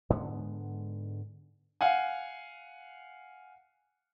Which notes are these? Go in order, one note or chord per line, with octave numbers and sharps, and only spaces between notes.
G#2 D3 G#3 B3
F5 F#5 G#5